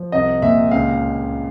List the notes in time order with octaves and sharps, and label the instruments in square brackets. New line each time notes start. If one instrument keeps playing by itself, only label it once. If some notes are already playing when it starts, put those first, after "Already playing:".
Already playing: [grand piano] F3
C2 D#5
A#2 E5
C#2 F5